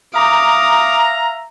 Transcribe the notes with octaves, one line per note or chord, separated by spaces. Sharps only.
E5 F5 A#5 D6 D#6